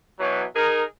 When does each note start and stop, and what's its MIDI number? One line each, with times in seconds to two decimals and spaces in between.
0.19 0.44 47
0.19 0.44 52
0.19 0.44 54
0.55 0.83 63
0.55 0.83 68
0.55 0.83 70